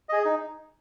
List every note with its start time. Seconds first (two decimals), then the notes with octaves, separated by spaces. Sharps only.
0.09 G#4 D#5
0.25 D#4